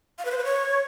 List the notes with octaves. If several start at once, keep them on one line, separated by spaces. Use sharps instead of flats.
F5
B4
C5
B4
C#5